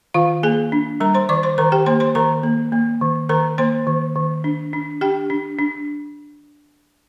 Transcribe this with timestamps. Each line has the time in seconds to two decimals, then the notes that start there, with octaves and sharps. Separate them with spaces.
0.14 D#3 F4 F5
0.43 A#3 G#4 G#5
0.72 D4
1.00 G3 A#4 A#5
1.14 C5 C6
1.29 D#3 D5 D6
1.43 C5 C6
1.58 D#3 A#4 A#5
1.72 G4 G5
1.86 A#3 C5 C6
2.00 C5 C6
2.15 D#3 A#4 A#5
2.43 A#3
2.72 A#3
3.01 D#3
3.29 D#3 A#4 A#5
3.58 A#3 C5 C6
3.87 D#3
4.16 D#3
4.44 D4
4.73 D4
5.01 D4 G4 G5
5.30 D4
5.59 D4